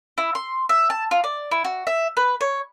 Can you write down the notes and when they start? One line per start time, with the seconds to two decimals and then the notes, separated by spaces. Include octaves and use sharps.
0.18 E4
0.35 C6
0.69 E5
0.90 A5
1.11 F4
1.24 D5
1.51 E4
1.65 F#4
1.87 E5
2.17 B4
2.41 C#5